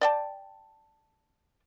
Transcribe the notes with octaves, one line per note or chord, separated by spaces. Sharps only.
D5 G5 A5